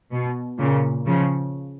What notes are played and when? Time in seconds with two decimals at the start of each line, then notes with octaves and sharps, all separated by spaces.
0.12 B2
0.59 A#2 C#3
1.06 C#3 F3